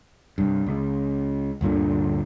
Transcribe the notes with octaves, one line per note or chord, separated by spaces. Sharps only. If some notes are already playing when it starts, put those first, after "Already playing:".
C2 G2
C#2 C#3
D2 G2 A#2 D3